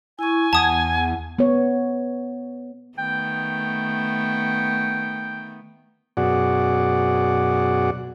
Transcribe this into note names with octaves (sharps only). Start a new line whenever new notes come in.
E4 G#5 C#6
E2 F#5 A5 D#6 G#6
B3 C#5
D#3 A3 B3 G5
F#2 B2 F#4 G#4 D5 F#5